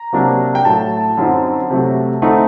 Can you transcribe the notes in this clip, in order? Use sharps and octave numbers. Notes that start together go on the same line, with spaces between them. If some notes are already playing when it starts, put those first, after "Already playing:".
Already playing: A#5
C3 F#3 A#3 D4
G5
A2 F#3 A3 A5
F#2 D3 F#3 C4 D#4
C3 F#3 A3
D3 A3 C4 D#4